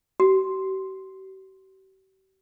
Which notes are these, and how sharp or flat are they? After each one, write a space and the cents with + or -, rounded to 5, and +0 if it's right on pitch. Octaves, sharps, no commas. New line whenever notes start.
G4 -45